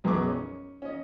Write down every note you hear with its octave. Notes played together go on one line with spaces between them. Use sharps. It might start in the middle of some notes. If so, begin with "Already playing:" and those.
B1 F#2 B3 G#4 C#6 D6
C#4
C#4 D#5